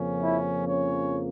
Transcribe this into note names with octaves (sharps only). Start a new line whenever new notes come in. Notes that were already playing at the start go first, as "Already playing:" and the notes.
Already playing: F2 C#3 F3 A#3 C#4
E4
C#4 C#5